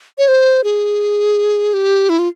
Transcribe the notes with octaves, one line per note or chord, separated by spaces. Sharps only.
C#5
C5
G#4
G4
E4
F4